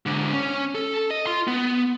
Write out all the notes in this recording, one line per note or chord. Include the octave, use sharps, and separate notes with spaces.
G#2 D3
C#4
A4
D#5
F4 C6
B3